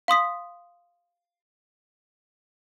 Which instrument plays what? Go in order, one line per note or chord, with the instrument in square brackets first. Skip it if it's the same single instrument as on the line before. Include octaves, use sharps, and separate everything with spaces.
[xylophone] F5 C6 D#6 B6